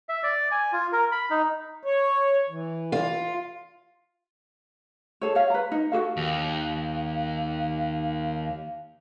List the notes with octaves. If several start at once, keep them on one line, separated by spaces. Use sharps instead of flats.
E5
D5
G#5
F4
A#4
B5
D#4
C#5
E3
F4
G#4 A4 C#5
C#5 F5
B4 A#5
D#4
F#4 G#4 A4 F5
D#2 F5